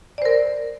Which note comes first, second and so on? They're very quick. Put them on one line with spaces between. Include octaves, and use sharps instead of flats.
D5 C5 A#4